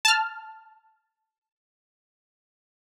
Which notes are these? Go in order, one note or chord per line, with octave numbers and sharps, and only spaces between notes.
A5 F6